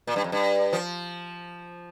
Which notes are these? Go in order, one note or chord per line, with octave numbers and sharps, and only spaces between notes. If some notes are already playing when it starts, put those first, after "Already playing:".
A#2
G2
F2
G2
F3